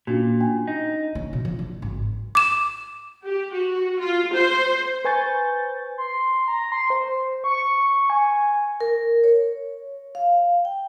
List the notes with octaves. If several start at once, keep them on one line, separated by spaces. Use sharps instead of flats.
A#2 C#4 D4 F#4
G5 G#5
D#4
C#4
B2
F3
G3
G#1
D6 E7
G4
F#4
F4
C5
B4 C5 G#5 C#6 G6 A6
C6
A#5
C6
C5
C#6
G#5
A#4
C#5
F5
G5